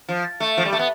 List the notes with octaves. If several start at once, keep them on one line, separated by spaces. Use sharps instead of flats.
F3
A3
F3
G3
A3
B3